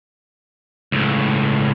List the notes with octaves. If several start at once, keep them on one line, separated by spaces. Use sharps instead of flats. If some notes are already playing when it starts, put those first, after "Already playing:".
C#2 A2